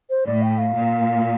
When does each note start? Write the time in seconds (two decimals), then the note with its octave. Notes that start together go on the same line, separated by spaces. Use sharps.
0.10 C5
0.26 A2 D5
0.42 G5
0.58 F5
0.74 A#2